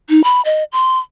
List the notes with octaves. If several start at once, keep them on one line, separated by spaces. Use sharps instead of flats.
D#4
B5
D#5
C6